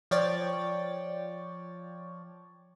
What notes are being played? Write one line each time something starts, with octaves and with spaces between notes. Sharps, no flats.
F3 C#5 D5 G5 A6